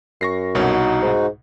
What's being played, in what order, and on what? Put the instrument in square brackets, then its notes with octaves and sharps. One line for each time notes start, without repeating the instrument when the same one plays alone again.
[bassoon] F#2 [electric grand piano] C#6 A#6 C7
[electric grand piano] C2 B2 C#5 [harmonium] D#4 F#4
[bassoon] G#2